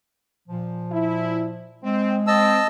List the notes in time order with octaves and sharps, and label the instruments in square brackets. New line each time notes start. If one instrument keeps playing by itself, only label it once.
[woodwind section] A#2 F3
[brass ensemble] E4
[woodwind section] G#3 [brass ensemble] C4
[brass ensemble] C4 [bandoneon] D#5 A5 E6